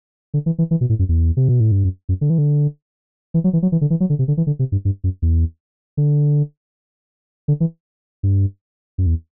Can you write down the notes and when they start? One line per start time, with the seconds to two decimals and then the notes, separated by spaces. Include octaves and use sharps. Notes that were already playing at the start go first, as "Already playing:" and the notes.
0.34 D3
0.46 E3
0.58 E3
0.71 E3
0.81 B2
0.89 A2
0.99 F#2
1.09 E2
1.37 C3
1.49 B2
1.60 A2
1.72 G2
1.84 F#2
2.09 F#2
2.21 D3
2.30 E3
2.38 D3
3.34 E3
3.44 F#3
3.53 E3
3.62 F#3
3.72 E3
3.81 D3
3.90 E3
4.00 F#3
4.10 D3
4.19 C3
4.28 D3
4.37 E3
4.47 D3
4.59 C3
4.72 G2
4.85 G2
5.04 F#2
5.22 E2
5.97 D3
7.48 D3
7.60 E3
8.23 G2
8.98 F#2
9.06 E2